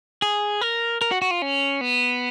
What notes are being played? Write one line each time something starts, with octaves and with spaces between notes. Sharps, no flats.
G#4
A#4
A#4
F#4
F#4
F4
C#4
B3